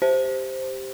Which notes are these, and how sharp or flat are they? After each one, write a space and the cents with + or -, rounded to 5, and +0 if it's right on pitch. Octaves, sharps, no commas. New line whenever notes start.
G4 +0 C5 +0